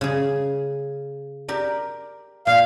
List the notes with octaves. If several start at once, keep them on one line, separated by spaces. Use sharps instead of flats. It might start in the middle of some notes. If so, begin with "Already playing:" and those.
C#3 G#4
G4 A#4 D5
A#2 F5